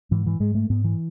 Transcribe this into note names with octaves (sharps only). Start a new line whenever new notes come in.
G#2 E3
E3
G#2 G#3
A3
G#2 B3
E3